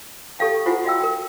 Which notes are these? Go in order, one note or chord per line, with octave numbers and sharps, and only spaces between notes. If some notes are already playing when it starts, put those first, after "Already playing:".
G4 A4 D5 F5 G5 A5
E4 F4 G#4 C5 F#5 G#5
F#4 D#5 F5 G5 A5 E6
A#4 G5